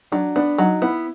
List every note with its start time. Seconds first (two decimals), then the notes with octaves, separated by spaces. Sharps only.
0.12 F#3 D4
0.36 B3 D4
0.58 F#3 D#4
0.82 B3 E4